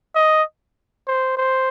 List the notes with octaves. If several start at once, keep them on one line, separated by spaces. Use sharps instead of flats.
D#5
C5
C5